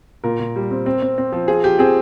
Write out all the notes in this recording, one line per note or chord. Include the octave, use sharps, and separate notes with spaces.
A#2 A#4
A#2
G3
C4
C4
C4
C4
F3
F3 G#4
F3 G4
C4 G#4